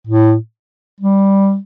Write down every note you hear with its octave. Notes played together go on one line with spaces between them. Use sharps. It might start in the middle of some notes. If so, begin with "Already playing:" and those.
A2
G3